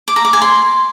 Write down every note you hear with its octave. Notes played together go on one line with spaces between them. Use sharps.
D6
A#5
D6
G#5
C6